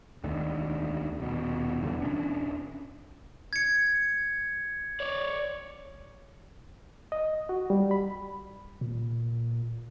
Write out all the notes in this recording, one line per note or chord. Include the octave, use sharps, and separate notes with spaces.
E1 D2 D3 D#3
D#1 B2
E2 G2 D3 E3
E1 C#4 D4
G#6 C#7
C#5 D5
D#5
F#4
G3
B5
A#2